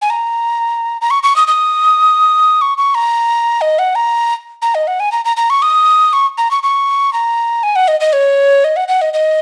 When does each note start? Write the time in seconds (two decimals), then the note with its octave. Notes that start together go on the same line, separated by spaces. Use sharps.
0.02 G#5
0.10 A#5
1.01 A#5
1.10 C#6
1.23 C#6
1.36 D#6
1.47 D#6
2.61 C#6
2.78 C#6
2.95 A#5
3.61 D#5
3.79 F#5
3.95 A#5
4.62 A#5
4.75 D#5
4.87 F#5
5.00 G#5
5.12 A#5
5.25 A#5
5.37 A#5
5.50 C#6
5.62 D#6
6.13 C#6
6.38 A#5
6.51 C#6
6.63 C#6
7.13 A#5
7.63 G#5
7.76 F#5
7.88 D#5
8.00 D#5
8.13 C#5
8.64 D#5
8.76 F#5
8.88 F#5
9.01 D#5
9.13 D#5